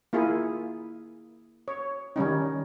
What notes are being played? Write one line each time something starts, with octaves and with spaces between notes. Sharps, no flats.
A#3 E4 F4 G#4
C#5
D#3 G3 C#4 D#4